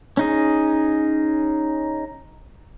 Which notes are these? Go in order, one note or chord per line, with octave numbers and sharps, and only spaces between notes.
C#4 D#4 G#4